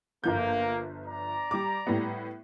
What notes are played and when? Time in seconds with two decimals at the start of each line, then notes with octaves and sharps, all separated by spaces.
0.24 G1 F3 A#3 G6
1.06 D5 A#5
1.51 G3 D6
1.87 A2 G3 B3